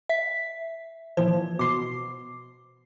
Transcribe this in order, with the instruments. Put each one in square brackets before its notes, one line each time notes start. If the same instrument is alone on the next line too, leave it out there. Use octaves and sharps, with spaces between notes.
[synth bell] E5 B6
[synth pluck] A#2 E3 F3 [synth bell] C5
[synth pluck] B2 C6 [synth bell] D6 C7